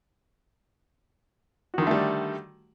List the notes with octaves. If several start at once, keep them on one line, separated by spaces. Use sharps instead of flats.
D3 D#3 G3 A3 F#4